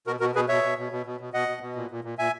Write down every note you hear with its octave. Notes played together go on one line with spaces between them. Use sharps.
B2 F#4 A#4
B2 F#4 A#4
B2 G#4 B4
B2 C#5 E5
B2
B2
B2
B2
B2
B2 D#5 F#5
B2
B2
A#2
A#2
A#2
A#2 E5 G#5